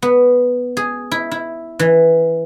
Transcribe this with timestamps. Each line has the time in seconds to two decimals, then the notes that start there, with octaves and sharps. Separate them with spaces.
0.02 B3
0.77 G#4
1.12 E4
1.31 E4
1.79 E3